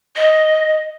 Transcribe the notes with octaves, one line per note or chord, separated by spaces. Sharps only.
D#5